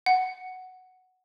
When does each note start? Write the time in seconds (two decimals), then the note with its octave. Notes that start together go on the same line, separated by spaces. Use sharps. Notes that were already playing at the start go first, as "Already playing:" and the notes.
0.06 F#5